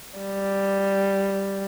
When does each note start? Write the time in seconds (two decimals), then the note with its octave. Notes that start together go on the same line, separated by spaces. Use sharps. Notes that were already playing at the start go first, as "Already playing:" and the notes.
0.19 G3